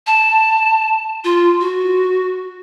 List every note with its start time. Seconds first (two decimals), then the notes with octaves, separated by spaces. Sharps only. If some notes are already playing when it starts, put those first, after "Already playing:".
0.07 A5
1.24 F4
1.61 F#4